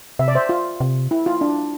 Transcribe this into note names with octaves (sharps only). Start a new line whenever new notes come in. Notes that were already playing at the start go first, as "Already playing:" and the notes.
C3 E5
D5
C5 E5
F4
C3
E4
F4
D4